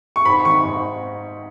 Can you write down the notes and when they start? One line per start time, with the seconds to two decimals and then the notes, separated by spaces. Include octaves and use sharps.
0.16 C#6
0.25 G#2 B5
0.45 D#3 C#6
0.64 G#2